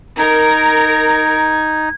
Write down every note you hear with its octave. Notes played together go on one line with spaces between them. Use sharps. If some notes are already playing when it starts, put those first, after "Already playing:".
D#4 A#4 G#6